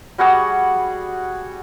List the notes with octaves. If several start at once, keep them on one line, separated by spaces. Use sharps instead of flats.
G3 F#4 G#4 F#5